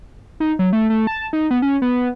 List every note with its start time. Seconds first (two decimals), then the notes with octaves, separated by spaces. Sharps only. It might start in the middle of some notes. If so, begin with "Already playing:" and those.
0.40 D#4
0.59 F#3
0.73 A3
0.90 A3
1.07 A5
1.33 D#4
1.51 B3
1.62 C#4
1.82 B3